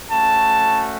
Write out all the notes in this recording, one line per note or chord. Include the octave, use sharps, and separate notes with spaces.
A3 C#4 F#4 A5